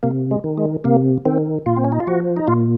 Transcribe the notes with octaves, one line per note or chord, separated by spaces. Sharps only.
C3 A#3
G#3
D#3
G#3
C3 A#3
D#3 C4
A#2 F4
C4
C#4
D#4
F4
F3 F#4
D#4
A#2 F4